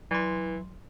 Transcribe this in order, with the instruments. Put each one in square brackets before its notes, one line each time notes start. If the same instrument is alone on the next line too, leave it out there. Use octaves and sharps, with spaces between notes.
[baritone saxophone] E3 [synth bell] F#3 C6